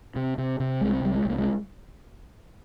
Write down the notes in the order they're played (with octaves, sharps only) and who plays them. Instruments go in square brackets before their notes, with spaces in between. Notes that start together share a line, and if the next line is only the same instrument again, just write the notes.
[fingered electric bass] C3
C3
C3
C2 G#3
C2 G3
G#3
C2 A#3
G#3